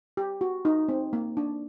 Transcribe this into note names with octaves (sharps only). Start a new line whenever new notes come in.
G4
F#4
D#4
C4
A#3
D4